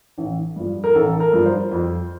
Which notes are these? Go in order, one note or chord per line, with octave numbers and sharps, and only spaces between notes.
A1
G2 F3
A#4
A1 A4
A#4
G2 F3
C5
F2